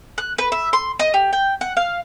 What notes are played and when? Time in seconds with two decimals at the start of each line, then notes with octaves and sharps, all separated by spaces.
0.18 F#6
0.38 B4
0.52 E5
0.73 C6
0.99 D#5
1.14 G4
1.33 G5
1.61 F#5
1.77 F5